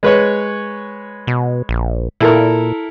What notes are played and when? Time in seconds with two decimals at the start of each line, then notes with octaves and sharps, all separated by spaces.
0.03 G#3 B4 C#5
1.27 B2
1.69 A#1
2.20 A#2 E4 A4 A#4